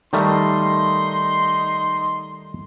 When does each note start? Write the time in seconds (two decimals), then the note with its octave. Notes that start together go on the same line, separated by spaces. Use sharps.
0.13 D#3 G3 A3 D#4 D#5 C6